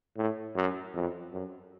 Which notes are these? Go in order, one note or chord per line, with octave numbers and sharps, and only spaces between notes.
A2
F#2
F2
F#2